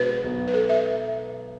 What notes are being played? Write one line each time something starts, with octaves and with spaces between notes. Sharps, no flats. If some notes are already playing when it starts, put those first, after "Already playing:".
Already playing: B2 G#3 B3 D4 B4
B1 B2 B3
B4
A4
E5